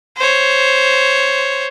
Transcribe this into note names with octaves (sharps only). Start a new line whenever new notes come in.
C5 C#5